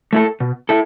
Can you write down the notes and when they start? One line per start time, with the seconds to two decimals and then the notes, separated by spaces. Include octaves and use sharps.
0.13 A3 E4 A4
0.40 B2
0.69 E4 A4